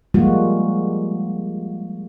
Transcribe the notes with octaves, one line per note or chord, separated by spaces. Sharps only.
F3 G3 G#3 A#3 F4 F#4